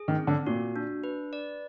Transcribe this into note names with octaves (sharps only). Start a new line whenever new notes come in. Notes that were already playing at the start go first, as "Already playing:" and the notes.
Already playing: G#4
D#3
C4
D3
A#2 F#4
D4
B4
D5